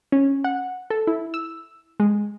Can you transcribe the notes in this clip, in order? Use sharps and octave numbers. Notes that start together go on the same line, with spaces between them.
C#4
F#5
A4
E4
E6
G#3